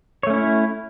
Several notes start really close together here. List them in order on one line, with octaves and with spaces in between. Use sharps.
C#5 A3 C#4 E4